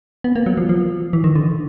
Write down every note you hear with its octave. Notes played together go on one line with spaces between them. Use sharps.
B3
A#3
F#3
F3
F3
E3
D#3
D3